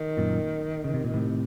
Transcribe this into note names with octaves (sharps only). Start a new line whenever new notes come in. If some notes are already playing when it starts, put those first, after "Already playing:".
Already playing: D#3
F#2 A#2
C#3
C3
A#2
A2 C3